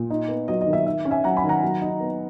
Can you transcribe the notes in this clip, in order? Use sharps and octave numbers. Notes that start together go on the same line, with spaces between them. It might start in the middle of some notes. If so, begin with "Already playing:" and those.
Already playing: A#2
D#4
B3
F#3 D#5
D#5
D#3
E5
D#3 E5
C#4
E5 G#5
F#3 F#5 A#5
G#5 B5
D#3
F#5 A#5
F#3
D#4
B3